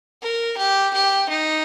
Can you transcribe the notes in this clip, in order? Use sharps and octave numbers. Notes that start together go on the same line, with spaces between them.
A#4
G4
G4
D#4